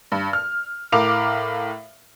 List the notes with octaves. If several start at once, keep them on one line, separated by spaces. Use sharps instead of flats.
G2
F6
A2 A#4 F5 D6 F7